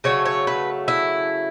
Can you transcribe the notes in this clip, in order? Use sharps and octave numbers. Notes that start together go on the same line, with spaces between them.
C#3 F#3 A3 C#5
C#5
B4
E4